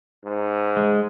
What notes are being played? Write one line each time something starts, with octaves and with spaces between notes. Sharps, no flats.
G#2
G#3